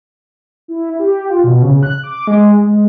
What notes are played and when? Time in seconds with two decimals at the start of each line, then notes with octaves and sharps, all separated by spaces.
0.68 E4
0.99 G4
1.30 F4
1.44 B2
1.62 C#3
1.83 F#6
2.04 D6
2.27 G#3
2.67 G#3